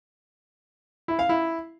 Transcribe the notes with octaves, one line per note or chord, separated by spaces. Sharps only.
E4
F5
E4